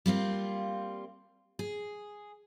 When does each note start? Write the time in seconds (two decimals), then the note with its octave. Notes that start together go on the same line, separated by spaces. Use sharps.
0.06 G3 A#3 C4 F4
1.59 G#4